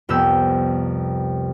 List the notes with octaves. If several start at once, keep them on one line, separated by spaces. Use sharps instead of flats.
C2 F2 B3 C4 E6 G6